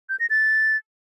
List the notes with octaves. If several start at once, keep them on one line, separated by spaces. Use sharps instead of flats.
G6
A#6
A6